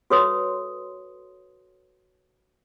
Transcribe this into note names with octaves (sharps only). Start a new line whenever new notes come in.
F#4 A4 B4 C#5 C6 D#6